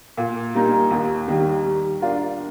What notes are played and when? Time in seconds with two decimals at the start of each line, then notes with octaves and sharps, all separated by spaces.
0.17 A#2
0.54 G3 A#3 D#4
0.91 D#2
1.28 D#3 G3
1.64 G3
2.00 D4 F4 A#4